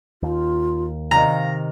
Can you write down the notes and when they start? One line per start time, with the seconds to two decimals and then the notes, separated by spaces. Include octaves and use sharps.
0.23 D#2 F4
1.11 C3 D#3 F5 A#5